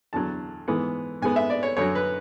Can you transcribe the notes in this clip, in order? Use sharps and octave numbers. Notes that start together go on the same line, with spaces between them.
E2 D3 F#3 A5
G#2 E3 B3
G#2 G#3 B3 G#5
E5
D5
C#5
F#2 D3 F#3 C#5
B4